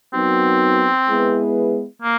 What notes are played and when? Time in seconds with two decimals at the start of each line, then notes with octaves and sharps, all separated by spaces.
0.13 F#3 B3 C4 D#4 F#4 A#4
1.07 G#3 B3 E4 G#4 B4
2.02 A#3